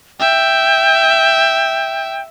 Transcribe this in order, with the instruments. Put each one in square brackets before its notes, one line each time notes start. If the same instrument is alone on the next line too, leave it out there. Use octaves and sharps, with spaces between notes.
[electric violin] E5 [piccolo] G5